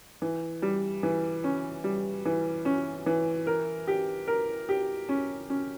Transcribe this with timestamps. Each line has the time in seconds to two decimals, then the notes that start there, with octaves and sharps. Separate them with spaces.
0.22 E3
0.62 G3
1.03 E3
1.44 C#4
1.84 G3
2.25 E3
2.65 C#4
3.06 E3
3.47 A#4
3.87 G4
4.28 A#4
4.69 G4
5.09 C#4
5.50 C#4